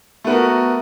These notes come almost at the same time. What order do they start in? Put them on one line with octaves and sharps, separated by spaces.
A3 B3 A#4 F#4